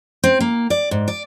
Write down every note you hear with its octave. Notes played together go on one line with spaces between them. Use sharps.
C4
A#3
D5
G#2
D5